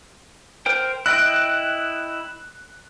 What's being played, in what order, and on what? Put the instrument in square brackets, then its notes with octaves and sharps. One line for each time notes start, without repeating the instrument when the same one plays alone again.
[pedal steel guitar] A#4 C5 G5
[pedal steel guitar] E4 D#5 G5 [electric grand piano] F#6